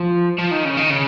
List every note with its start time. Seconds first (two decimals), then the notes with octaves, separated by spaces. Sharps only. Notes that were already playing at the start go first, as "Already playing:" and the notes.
Already playing: F3
0.38 F3
0.51 D#3
0.65 C#3
0.77 D#3
0.90 C#3